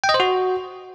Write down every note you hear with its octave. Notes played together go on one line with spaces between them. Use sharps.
G5
D#5
C5
F#4